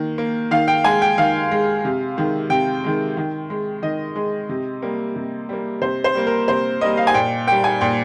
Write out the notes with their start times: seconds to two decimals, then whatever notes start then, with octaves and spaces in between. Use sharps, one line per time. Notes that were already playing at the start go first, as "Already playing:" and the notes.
Already playing: D#3 A#3
0.18 A#3
0.51 D#3 F5
0.68 G5
0.84 G#3 G#5
1.02 G5
1.18 D#3 F5
1.51 G#3
1.85 C3
2.17 D#3 G#3
2.50 C3 G5
2.84 D#3 G#3
3.17 D#3
3.50 G#3
3.82 D#3 D#5
4.16 G#3
4.49 C3
4.82 G3 A#3
5.16 C3
5.49 G3 A#3
5.81 C3 C5
6.04 C5
6.15 G3 A#3
6.27 A#4
6.48 C3 C5
6.81 G3 A#3 D#5
6.97 F5
7.07 G#5
7.14 A#2 G5
7.47 G3 A#3 G5
7.64 G#5
7.81 A#2 G5